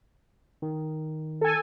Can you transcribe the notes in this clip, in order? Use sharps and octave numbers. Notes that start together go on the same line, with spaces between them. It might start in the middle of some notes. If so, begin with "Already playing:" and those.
D#3
A4 G#5